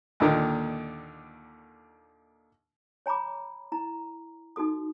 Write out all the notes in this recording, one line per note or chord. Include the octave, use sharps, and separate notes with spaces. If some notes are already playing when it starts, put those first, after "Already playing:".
D#2 A#2 D3 D#3
C#5 G#5 A#5 B5 D6
E4 A#5
D#4 F#4 A4 D#6